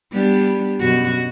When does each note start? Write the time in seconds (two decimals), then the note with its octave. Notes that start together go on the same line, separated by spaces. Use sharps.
0.11 G3 B3 D4
0.79 F#2 B2 F#4